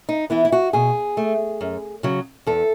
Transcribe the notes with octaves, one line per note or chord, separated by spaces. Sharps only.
D#4
E3 B3 E4
E4
F#4
B2 G#4
A3
F#2
C#3 F#3
E2 A4